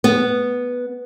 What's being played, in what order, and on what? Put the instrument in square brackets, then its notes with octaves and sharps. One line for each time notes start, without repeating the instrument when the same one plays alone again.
[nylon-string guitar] B3